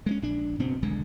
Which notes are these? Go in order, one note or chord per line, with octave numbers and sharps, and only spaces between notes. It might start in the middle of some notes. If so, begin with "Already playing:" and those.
G#3 A3 C#4
A#1 D4
F#1 B2 B3 C4
D#1 B1 D3 G#3